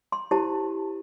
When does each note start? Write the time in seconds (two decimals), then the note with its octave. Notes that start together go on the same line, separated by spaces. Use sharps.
0.12 C6
0.31 E4 G4 C5 A5